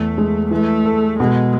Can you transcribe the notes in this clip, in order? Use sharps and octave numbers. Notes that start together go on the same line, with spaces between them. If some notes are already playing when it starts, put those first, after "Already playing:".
Already playing: E2 A3
G#3
E3 A3
A4
B2 G#3